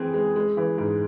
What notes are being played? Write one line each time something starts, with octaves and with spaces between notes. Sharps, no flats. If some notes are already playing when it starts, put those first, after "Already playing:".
Already playing: E3 C4 G#4
G#3
G#3
E3
G#2